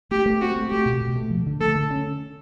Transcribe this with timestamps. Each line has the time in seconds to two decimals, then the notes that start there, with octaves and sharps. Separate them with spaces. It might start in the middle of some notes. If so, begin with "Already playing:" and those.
0.11 A3 G4
0.26 A3
0.41 C4 F#4
0.56 A3
0.71 A3 G4
0.85 B2
1.01 B2
1.16 A3
1.30 F3
1.46 D3
1.61 A3 A4
1.75 D3
1.91 C#4